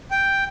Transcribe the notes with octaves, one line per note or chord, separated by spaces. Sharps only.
G5